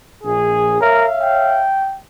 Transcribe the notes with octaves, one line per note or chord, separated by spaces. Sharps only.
A#1 G#4
A#4 C#5 E5 F5
G5